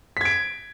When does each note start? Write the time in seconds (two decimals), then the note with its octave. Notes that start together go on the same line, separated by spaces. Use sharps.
0.17 B6
0.21 G#6
0.25 D7